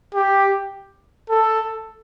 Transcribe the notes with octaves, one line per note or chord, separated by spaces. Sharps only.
G4
A4